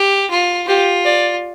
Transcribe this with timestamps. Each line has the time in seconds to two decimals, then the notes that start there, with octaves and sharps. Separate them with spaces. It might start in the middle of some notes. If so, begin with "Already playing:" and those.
Already playing: G4
0.30 F4
0.67 F4 G4
1.05 D5